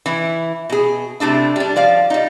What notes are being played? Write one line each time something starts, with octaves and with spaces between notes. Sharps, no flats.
E3 E4
B2 G#4
C3 A3 D4 E4
G3 D4
F3 D5 F5
G3 D#4